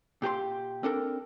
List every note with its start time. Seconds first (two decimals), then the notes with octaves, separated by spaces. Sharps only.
0.22 A#2 G4 G#4 C6
0.83 C4 D4 A4 A#4